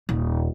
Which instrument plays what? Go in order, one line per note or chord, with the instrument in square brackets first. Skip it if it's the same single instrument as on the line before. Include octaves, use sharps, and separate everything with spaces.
[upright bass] D#1